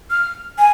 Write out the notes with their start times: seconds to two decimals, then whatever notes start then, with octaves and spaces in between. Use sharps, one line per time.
0.11 F6
0.58 G#5